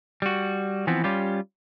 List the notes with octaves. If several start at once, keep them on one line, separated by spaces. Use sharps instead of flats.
G3 F#4
E3 F3 B3 C4
G3 C#4 F4 G4